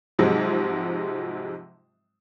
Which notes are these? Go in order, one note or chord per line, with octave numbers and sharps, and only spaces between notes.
G#2 C3 F3 F#3 G#3